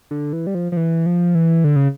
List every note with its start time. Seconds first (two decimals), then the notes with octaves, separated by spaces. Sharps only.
0.11 D3
0.33 E3
0.47 G3
0.55 F3
0.72 F3
0.77 E3
1.06 F3
1.35 E3
1.64 D3
1.76 C#3